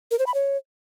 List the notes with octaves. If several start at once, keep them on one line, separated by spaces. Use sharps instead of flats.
A#4
C5
B5
C#5